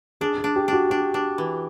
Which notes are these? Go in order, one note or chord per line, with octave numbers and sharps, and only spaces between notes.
D4 G#4
G#4
D4
G4
D4 F#4
D4 G4
D4
E3